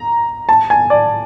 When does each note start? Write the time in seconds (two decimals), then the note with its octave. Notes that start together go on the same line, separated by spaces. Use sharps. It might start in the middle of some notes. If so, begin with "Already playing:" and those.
Already playing: A#5
0.49 A5
0.70 G#5
0.90 D5